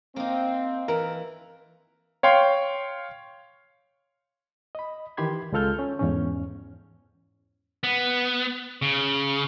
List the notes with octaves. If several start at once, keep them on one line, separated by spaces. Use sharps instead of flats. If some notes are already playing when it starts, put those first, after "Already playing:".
A#3 C4 D#4
E3 A#4
C#5 F5 G5 C6
D#5 B5
D#3 E3 G4 B5 C6 G#6
C#2 G#3 F4 A4 F6 G6
C#4
E2 G#2 C#4
B3
C#3